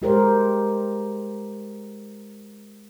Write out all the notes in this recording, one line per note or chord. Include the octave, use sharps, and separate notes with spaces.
G#3 G4 A#4 C5